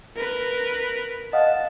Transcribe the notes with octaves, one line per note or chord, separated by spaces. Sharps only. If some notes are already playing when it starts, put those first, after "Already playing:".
A#4 B4
D#5 F5 F#5 A5